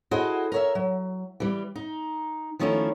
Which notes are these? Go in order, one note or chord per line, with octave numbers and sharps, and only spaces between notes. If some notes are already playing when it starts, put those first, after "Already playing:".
E4 F#4 G#4 A4 C5 D#5
A#4 C#5 E5
F#3
E3 G3
D#4
D#3 F3 A3 C#4 D#4 E4